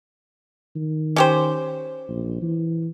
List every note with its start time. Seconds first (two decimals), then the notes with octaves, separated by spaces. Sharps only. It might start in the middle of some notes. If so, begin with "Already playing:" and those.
0.76 D#3
1.16 C#4 G4 C5
2.09 A#1
2.42 E3